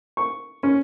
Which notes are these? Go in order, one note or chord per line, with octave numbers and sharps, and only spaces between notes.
C#6
C#4